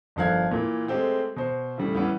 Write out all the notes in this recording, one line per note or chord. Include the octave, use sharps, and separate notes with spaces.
G1 D#3 F3 F5 F#6 G#6
A#2 E3
G#3 A3 C4 G4
B2 C5
A2 C#3 G3
E3 G3 B3 C#4